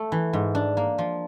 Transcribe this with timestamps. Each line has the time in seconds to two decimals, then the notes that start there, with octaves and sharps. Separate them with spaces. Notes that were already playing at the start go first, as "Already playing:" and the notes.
Already playing: A3
0.12 E3
0.33 G#2
0.55 D4
0.77 A#3
0.98 F3